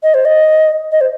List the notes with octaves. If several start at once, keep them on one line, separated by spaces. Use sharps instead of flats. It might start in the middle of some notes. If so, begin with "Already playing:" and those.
D#5
C5
D#5
D#5
C5